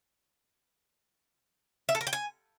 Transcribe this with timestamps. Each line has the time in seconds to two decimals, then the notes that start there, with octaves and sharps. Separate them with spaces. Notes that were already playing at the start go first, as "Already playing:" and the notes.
1.89 E5
1.95 A4
2.01 A#4
2.07 G5
2.13 G#5